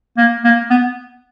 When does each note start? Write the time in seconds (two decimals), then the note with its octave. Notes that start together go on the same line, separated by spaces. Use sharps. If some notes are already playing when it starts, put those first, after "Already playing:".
0.18 A#3
0.44 A#3
0.70 B3